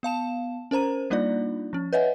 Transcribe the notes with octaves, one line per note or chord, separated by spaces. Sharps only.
B3 F5 A5 E7
C#4 A#4 C5 A#5 D#7
G3 A#3 D4 D#4 F4 D5
F3 C#4
B4 C#5 D#5 E5 F#5 G#5